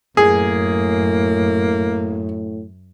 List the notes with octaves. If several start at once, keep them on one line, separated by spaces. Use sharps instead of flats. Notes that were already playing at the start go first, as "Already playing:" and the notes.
F#2 A2 A#3 G#4